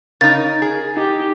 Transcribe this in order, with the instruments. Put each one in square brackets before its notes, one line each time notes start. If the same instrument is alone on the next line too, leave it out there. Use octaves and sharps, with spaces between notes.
[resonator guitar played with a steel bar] C#3 D#4 [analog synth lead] A#4 [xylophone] A6
[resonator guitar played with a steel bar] G#4
[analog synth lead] D#4 [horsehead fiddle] G4